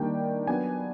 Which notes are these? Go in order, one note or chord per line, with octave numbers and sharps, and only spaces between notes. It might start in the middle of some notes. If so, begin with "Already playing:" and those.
Already playing: D#3 G3 A#3 D4 G5
F#3 B3 D4 G#5